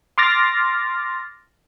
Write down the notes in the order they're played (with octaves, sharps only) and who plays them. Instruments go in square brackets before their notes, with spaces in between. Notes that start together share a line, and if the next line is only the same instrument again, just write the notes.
[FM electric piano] C6 D6 F6 A6 A#6